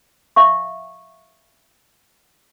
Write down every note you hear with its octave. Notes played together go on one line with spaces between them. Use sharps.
E5 F5 C#6